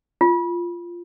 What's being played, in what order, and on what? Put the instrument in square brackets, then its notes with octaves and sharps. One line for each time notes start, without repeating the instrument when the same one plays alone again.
[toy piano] F4